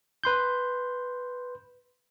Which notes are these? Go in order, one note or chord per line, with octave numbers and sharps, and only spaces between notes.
B4 C6 G6